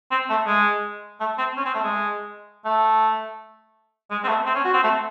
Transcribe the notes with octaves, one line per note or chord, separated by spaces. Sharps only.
C4
A3
G#3
A3
C4
C#4
C4
A3
G#3
A3
G#3
C4
A3
C4
C#4
F#4
C4
A3